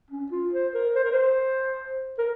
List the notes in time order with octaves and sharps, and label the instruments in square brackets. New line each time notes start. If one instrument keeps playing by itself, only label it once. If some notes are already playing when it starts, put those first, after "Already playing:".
[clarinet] C#4
F4
C5
A#4
C5
A#4
C5
A#4